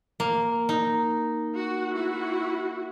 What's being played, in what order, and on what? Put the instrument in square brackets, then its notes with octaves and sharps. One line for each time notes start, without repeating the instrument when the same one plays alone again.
[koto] A#3
D#4
[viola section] F#4
E4 F#4